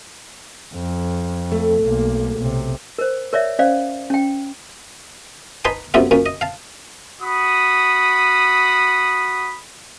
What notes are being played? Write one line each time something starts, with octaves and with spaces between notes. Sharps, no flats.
F2
A3
B1 A#3
B1 C3
A#4 C5
A#4 C#5 D5 E5
C#4 C5 D5 F5
C#4 G5
D#4 B4 G#5 A5 C6 D#6
F#2 A2 C3 B3 E4 F4
F#2 A#2 A#3 C#4
D#5
F5 A5
F#4 B5 D#6